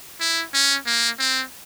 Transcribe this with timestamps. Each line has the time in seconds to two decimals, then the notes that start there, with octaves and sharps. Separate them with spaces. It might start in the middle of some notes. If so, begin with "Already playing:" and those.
0.20 E4
0.53 C#4
0.86 A#3
1.19 C4